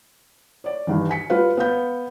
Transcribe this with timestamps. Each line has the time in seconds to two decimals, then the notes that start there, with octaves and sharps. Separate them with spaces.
0.64 C#5 D5
0.87 G2 D#3 E3
1.09 G#5 B6 C#7
1.30 G3 F4 B4 F5
1.57 B3 F5 G6